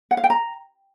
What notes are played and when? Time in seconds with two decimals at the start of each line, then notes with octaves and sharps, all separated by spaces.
0.11 F#5
0.17 F5
0.24 G5
0.30 A#5